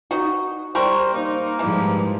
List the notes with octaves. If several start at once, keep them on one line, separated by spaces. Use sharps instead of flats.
D#4 F#4
G3 A#4 C5 C#6
A#3 D#4
G#2 E3 F3 G3